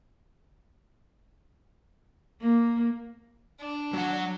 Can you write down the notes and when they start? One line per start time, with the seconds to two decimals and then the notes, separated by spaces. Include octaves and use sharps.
2.41 A#3
3.59 D4
3.93 F#3 F#5